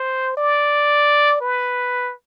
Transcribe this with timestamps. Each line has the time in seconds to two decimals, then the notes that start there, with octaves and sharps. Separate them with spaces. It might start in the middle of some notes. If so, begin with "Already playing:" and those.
Already playing: C5
0.37 D5
1.41 B4